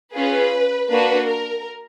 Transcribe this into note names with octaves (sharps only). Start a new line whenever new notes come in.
C#4 F4 G#4 B4
A#3 D4 F#4 B4
A#4